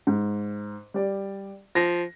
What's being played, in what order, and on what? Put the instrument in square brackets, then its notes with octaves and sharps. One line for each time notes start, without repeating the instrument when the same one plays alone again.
[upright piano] G#2
G3 D5
[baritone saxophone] F3 [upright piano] A#6